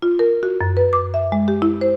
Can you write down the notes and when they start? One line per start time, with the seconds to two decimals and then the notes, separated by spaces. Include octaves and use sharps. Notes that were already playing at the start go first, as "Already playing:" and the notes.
0.02 F4
0.19 A#4
0.43 F#4
0.61 F#2
0.77 B4
0.93 D6
1.14 E5
1.32 G#3
1.48 G4
1.62 E4
1.81 C5